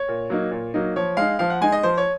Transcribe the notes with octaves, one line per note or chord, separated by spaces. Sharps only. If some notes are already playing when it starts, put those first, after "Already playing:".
Already playing: C#5
A#2
F#3 A#3 D#4
A#2
F#3 A#3 D#4
F3 C#5
G#3 D#4 F5
F3 F5
F#5
G#3 D#4 G#5
D#5
F3 C5
C#5